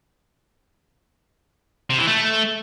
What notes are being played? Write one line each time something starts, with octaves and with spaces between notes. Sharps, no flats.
C3
E3
A3